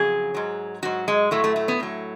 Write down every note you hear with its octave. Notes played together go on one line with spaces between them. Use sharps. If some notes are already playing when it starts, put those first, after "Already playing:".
Already playing: F2 C#3 F#3 G#4
G#2 F#3
G#2 F#3 F#4
G#3
A2 F#3 A3
A3
A3
B3
A2 F#3